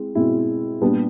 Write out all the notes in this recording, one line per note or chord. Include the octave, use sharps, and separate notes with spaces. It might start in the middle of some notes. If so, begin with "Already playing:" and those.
Already playing: G#3 C4 E4
B2 G#3 C4 E4
A#2 G3 B3 D4 G4